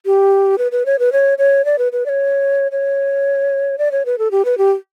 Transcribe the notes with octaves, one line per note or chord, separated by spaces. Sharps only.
G4
B4
B4
C#5
B4
C#5
C#5
D5
B4
B4
D5
C#5
C#5
D5
C#5
B4
A4
G4
B4
G4